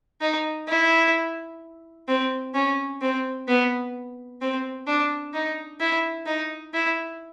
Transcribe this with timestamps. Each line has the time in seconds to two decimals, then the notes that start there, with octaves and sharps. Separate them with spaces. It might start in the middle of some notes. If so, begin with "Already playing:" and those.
0.21 D#4
0.68 E4
2.08 C4
2.54 C#4
3.02 C4
3.48 B3
4.41 C4
4.87 D4
5.34 D#4
5.80 E4
6.26 D#4
6.74 E4